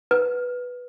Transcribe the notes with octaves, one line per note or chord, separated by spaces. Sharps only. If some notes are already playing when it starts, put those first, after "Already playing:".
B4